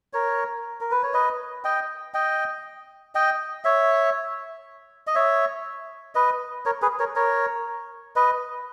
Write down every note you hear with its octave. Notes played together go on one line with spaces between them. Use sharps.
A#4 C#5
A#4
B4
C#5
B4 D#5
D#5 G5
D#5 G5
D#5 G5
C#5 E5
D#5
C#5 E5
B4 D#5
A#4 C#5
G#4 B4
A#4 C#5
A#4 C#5
B4 D#5